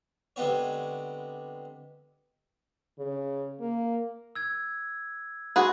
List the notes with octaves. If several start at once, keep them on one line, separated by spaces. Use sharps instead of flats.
D3 G3 G#3 B3 C4 C#5
C#3
A#3
E6 G#6
F#4 G#4 B5 C6